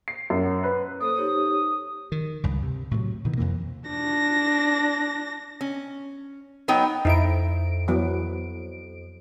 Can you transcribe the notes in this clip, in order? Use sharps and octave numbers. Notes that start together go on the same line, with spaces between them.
C7
F#2
B4
A#3 A4 C5 D#6
D#4 G4 C#5
D#3
C#2 G2
C3
A2 C3 D#3 F#3
B2 D#3 E3
F2 C3 E3 A#3
D4 A#6
C#4
F#3 B3 D#4 C#5 G5
F2 D#4 E4 D7
E3 F#3 B3